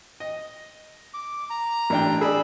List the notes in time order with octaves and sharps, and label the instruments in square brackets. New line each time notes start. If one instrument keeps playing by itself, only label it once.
[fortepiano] D#5
[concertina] D6
A#5
[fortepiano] A1 D4 G5
[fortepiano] G#4 D5 [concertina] B5 E6